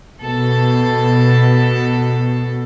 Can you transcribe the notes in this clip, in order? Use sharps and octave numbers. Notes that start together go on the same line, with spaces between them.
B2 A4